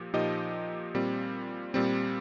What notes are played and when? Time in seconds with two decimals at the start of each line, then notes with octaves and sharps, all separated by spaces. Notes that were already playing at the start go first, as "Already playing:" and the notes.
Already playing: A#2 F3 G4
0.14 A#2 F3 D#4 G4 D#5
0.94 A#2 G3 C4
1.74 A#2 G3 C4